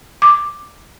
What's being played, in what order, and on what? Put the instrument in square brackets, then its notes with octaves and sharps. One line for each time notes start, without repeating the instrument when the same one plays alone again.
[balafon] D6